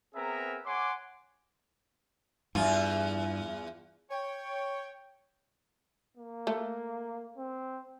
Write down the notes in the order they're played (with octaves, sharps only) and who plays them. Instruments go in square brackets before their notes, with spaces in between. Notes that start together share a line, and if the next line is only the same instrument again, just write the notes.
[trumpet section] B3 C4 G#4 A#4 E5 A#5
C#5 F#5 G#5 C6 D6
[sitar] E2 F4 [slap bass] G2
[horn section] C#5 G5
[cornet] A#3
[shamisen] A3
[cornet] C4